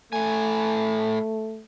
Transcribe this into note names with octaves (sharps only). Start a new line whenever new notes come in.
A2 A3 G#5